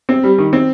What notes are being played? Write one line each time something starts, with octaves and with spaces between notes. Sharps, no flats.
C4
G3
D#3
C4